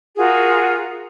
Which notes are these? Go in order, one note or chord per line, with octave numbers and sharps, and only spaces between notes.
F4 F#4 G#4 A#4